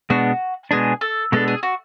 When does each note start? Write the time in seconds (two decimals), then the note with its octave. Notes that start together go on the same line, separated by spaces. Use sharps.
0.10 B2 G#3 B3 D4 F#4
0.71 B2 G#3 B3 D4 G#4
1.01 A4
1.32 B2 G#3 B3 D4 A4
1.48 G#4
1.63 F#4